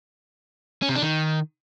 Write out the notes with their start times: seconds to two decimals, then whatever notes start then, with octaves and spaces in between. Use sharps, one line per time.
0.82 C#4
0.89 C3
0.96 D4
1.02 D#3